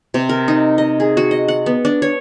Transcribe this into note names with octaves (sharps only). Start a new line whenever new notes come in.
C3
A#4
D#4
D#5
G#4
F#4
D#5
F#5
B3
D4
C#5